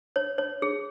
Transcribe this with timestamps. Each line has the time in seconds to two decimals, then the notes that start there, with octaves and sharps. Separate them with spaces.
0.16 C#5
0.38 C#5
0.62 G#4